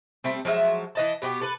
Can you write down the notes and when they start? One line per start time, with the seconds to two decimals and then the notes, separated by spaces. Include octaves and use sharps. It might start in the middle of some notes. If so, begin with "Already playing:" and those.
0.24 G3 A3 C4
0.45 F3 F#3 G#3 E5
0.95 E3 D#5 A5
1.22 B2 B3 D4 G4
1.42 A4 B4